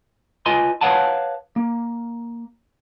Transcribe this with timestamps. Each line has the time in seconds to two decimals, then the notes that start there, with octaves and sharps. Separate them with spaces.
0.46 F4 B4 D#5 G#5 C6
0.81 B4 C#5 F5 F#5 A5
1.56 A#3